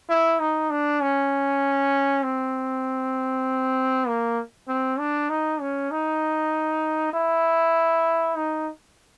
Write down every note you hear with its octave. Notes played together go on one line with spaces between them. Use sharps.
E4
D#4
D4
C#4
C4
A#3
C4
D4
D#4
C#4
D#4
E4
D#4